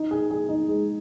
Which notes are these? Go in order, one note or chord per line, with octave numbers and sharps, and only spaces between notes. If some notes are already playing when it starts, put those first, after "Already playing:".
Already playing: D#4
G#4
G#4
D#4
G#3